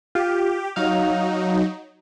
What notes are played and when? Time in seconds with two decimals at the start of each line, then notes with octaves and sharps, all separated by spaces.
0.15 F4 G4
0.76 F#3 D#4 F5